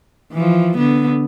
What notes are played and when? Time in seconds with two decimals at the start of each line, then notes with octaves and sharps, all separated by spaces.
0.33 E3 F3
0.78 D3 B3